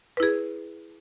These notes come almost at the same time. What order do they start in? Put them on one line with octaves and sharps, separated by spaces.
B4 E4 G#4